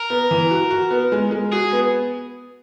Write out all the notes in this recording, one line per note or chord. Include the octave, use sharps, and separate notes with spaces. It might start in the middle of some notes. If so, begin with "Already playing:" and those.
Already playing: A#4
B3
E3
F#4
F#4
B3
G#3
G#3
F#4 G#4
B3